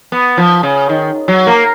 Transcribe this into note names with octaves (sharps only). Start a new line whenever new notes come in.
B3
F3
C#3
D#3
F#3
A#3